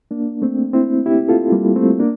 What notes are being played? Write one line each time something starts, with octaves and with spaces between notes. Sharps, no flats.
A#3 D4
A3 C4
C4 E4
E4 G4
F4 A4
G3 A#3
A3 C4
A#3 D4